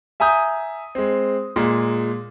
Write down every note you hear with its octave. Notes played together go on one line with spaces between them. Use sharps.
E5 G#5 A#5 D#6 G6
G#3 C4
A#2 G#3